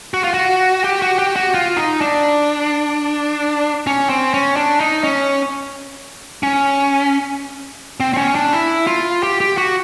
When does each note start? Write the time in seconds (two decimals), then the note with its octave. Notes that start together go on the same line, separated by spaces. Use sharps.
0.14 F#4
0.24 F4
0.34 F#4
0.84 G4
1.02 F#4
1.19 G4
1.36 F#4
1.55 F4
1.77 D#4
2.01 D4
3.87 C#4
4.10 C4
4.34 C#4
4.57 D4
4.80 D#4
5.04 C#4
6.43 C#4
8.00 C4
8.13 C4
8.17 C#4
8.35 D4
8.53 E4
8.87 F4
9.23 G4
9.41 G4
9.58 F#4